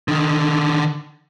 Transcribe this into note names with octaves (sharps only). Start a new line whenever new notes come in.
D3 D#3